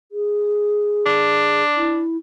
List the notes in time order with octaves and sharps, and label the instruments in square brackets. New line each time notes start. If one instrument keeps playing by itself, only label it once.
[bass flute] G#4
[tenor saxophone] D4
[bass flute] E4